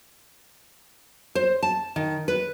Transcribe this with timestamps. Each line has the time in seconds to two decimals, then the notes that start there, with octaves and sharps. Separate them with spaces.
1.35 C5
1.63 A5
1.96 D#3
2.28 B4